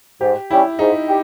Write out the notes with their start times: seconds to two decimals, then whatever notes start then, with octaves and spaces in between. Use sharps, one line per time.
0.21 G#2 G4
0.50 G3 C#4 E4 G4
0.79 G#2 D#4
1.08 G4